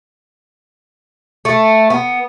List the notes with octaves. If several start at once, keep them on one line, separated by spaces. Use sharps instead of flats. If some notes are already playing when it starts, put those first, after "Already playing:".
A3
B3